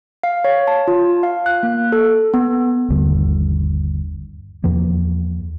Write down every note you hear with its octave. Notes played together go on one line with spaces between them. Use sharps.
F5
C#5
A5
F4
F5
F#6
A#3
A4
B3
G1 D#2 D3 G3
E2 F3 A#3